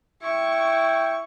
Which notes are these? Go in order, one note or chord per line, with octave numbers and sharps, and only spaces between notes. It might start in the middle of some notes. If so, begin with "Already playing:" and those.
E4 G5 C#6